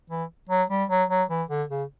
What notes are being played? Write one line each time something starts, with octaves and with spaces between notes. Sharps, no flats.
E3
F#3
G3
F#3
F#3
E3
D3
C#3